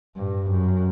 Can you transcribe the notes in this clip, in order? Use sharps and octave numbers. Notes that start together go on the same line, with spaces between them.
G2
F#2